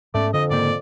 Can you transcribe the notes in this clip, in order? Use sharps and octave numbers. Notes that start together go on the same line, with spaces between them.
G#2 A3 B3 C#4 D5
F2 D3 D#5
G#2 C#3 A#3 D5